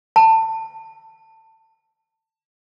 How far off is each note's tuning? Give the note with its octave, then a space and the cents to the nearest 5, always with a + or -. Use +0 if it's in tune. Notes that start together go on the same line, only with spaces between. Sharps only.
A5 +25